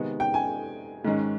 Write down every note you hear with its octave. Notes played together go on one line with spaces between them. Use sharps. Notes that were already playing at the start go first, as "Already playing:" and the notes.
Already playing: C3 D#3 G#3 B3
G5
G#5
G#2 D#3 G#3 C#4